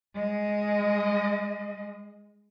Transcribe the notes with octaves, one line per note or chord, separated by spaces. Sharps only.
G#3 D#5